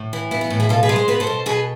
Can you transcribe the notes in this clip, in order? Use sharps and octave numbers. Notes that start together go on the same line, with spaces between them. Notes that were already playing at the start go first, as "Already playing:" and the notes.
Already playing: A2
E3
B3 E4
E4
A2
E4 G#4
B2 F4 A4
G#4 B4
G#3
C5
B3 B4
A4 C5
B2
B2 G#4 B4